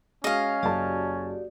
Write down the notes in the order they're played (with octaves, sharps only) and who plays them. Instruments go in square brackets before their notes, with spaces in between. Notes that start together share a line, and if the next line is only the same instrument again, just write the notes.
[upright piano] G#3 F#4 [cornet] C#4 [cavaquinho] D#5 F5
[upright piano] F#1 A5 [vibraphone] F#4 G4 D5